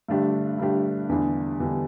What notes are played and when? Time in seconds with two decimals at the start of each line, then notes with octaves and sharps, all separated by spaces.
0.09 G2 D3 A3 D4 G4
0.59 G2 D3 A3 D4 G4
1.09 E2 D3 G3 D4 G4
1.60 E2 D3 G3 D4 G4